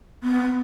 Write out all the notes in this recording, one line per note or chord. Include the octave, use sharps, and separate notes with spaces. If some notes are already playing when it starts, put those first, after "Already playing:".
B3